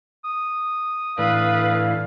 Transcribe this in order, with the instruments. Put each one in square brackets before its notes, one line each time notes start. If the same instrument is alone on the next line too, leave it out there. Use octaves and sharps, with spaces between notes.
[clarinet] D#6
[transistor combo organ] A2 E3 [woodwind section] D4 A4 F5 [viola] B4